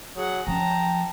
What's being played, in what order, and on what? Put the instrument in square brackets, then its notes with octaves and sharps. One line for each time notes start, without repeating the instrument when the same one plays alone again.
[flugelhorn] F#3 [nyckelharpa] G#4 F#5
[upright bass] F3 C#4 [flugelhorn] G5 [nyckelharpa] A5 A#5